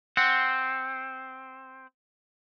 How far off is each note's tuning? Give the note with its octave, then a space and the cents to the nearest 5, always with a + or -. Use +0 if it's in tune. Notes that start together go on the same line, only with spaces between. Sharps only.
C4 +0 F#5 +0